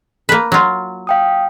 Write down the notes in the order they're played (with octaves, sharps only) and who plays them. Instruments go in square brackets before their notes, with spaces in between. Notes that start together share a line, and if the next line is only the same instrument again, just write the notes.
[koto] A#3 B4
F#3 F4
[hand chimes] F5 G5 D#6